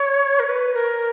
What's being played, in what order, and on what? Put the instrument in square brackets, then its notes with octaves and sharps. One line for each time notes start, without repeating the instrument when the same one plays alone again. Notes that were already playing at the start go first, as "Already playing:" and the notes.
Already playing: [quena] C#5
A#4
B4
A#4